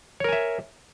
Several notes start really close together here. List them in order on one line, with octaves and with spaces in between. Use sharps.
C#5 A#4 G#5 E5